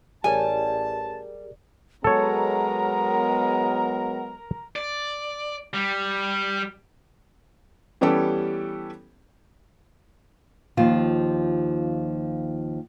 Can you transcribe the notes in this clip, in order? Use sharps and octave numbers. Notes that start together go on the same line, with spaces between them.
A1 G3 G4 G#4 A#4 C#5 G#5 A5
F#3 G#3 B3 A4 A#4 C#5 F#5 A#5
D5
G3
E3 G3 B3 C#4 G4 A4
D#2 F3 F4